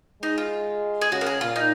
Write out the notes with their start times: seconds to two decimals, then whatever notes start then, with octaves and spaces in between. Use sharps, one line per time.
0.22 G#3 D#4
0.38 F4
1.01 G#4
1.12 C#3 F#4
1.21 A#4
1.27 G#4
1.41 A#2 F4
1.56 D#4